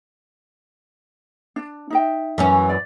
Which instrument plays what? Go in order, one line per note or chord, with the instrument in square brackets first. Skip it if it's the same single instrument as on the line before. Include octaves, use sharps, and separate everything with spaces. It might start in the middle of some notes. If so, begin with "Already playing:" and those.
[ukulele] D4
D#4 E5 G5
[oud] F#2 E3 C#4
[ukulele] D5